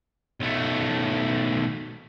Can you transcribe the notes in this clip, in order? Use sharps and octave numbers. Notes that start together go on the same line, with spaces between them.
B1 A3